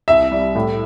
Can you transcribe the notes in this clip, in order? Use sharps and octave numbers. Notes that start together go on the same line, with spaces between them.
C2 E5
G3
A2